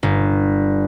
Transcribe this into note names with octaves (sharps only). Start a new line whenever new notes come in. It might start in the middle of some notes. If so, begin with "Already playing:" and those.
G1